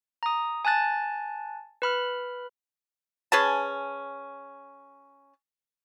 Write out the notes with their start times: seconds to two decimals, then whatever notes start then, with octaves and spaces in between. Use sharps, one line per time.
0.23 A#5 D#6
0.65 G#5 A5 F#6 A6
1.82 B4 B5 F6
3.32 C#4 G#4 B4 A5